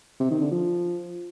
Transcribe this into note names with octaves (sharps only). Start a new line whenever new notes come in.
C3
D#3
D3
F3